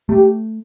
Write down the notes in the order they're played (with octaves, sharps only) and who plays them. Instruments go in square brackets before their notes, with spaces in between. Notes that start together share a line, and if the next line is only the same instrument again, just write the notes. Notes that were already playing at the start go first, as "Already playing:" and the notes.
[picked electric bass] A3 [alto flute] G4